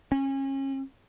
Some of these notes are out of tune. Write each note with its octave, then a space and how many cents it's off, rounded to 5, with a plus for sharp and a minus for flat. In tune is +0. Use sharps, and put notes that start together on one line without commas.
C#4 -30